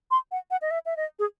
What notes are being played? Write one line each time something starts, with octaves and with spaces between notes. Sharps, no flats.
C6
F#5
F#5
D#5
E5
E5
D#5
G#4